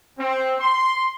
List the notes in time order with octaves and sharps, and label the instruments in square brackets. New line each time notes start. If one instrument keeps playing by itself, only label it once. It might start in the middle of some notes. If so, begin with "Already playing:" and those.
[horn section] C4
C6